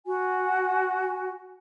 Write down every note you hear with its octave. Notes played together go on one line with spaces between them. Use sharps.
F#4 G#5